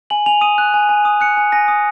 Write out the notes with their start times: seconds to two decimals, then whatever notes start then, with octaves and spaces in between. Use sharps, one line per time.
0.10 G#5 F#7
0.26 G#5 F7
0.41 D#6 D#7
0.58 F#6
0.74 G#5
0.89 G#5
1.05 D#6
1.21 F#6 C#7
1.37 G#5
1.52 G#5 A#6
1.68 D#6